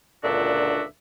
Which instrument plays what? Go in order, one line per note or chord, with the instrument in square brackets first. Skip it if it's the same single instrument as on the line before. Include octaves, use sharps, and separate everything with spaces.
[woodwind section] C#2 A#2 D3 D4 F#4 E5